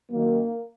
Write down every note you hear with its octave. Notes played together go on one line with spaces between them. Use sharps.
F#2 D#3 A#3